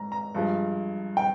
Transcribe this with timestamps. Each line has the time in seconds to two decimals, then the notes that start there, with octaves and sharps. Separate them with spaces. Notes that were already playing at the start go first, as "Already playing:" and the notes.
Already playing: G#2 A#5
0.12 A#5
0.35 G2 F3 G#3
1.17 G5